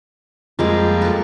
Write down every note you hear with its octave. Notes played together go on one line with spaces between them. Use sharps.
F2 G3 G#3 A#3 C4 F4
A4 B4